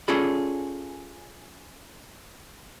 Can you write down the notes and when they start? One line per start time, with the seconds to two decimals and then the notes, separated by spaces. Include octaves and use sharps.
0.08 C#4 F4 G#4 A4 D5 B5